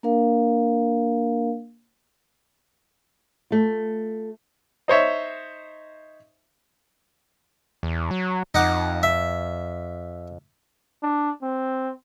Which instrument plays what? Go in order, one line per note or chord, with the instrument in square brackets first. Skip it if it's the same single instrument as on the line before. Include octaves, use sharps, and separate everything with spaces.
[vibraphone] A#3 D4 A#4 F5
[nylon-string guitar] A3 F4
[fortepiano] D#4 C5 C#5 E5
[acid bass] E2
F#3
[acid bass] F2 [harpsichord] D#4 F#5 D6
[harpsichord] E5
[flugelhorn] D4
C4